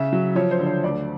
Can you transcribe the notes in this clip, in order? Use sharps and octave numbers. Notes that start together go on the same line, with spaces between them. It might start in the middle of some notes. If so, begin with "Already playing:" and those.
Already playing: C#3 E5
F#3
F3 C#5
C5
D3
C#5
D2 D5